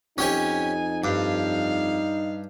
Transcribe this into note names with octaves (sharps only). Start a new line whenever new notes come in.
F2 C#4 D#4 G4 C#5 G#5
G2 F5